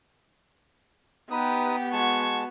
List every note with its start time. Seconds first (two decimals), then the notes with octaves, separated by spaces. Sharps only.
1.31 B3 D#4 G4 B4 D#6
1.93 G#3 F#4 A5 C#6 G#6